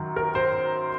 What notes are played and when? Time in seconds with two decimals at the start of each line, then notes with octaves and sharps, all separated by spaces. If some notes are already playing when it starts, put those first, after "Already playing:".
Already playing: F#2 D#3 F#3
0.16 A#4
0.35 C5